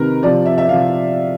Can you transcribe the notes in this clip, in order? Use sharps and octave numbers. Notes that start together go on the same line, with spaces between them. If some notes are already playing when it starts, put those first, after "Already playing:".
Already playing: C3 D#3 A#4 B4
C3 F3 D5
E5
E5
C3 F3 F5